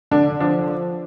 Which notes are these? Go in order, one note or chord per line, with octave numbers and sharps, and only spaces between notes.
D3 D4
F3 D4
F3